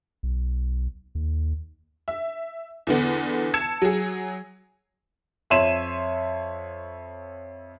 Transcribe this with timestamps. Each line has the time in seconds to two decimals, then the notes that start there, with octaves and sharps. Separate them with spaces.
0.23 B1
1.15 D#2
2.08 E5
2.87 E2 D3 B3
3.54 A5 E6 G#6 C#7 E7
3.82 F#3 G#4
5.50 F2 C#5 E5 C6 D#7 E7